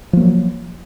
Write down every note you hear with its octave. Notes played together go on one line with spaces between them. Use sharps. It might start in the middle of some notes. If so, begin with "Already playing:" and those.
F3 F#3 A#3